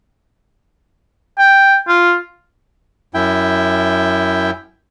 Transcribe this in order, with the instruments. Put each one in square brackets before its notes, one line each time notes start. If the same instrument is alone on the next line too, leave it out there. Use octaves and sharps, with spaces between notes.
[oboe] G5
F4
[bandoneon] F#2 E4 G5